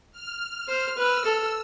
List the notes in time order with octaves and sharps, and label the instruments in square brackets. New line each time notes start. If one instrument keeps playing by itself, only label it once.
[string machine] F6
[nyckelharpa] C5
[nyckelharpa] B4 [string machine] E6
[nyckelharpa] A4 [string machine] E6